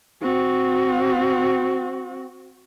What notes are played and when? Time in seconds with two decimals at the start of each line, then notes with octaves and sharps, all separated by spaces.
0.22 C4 F#4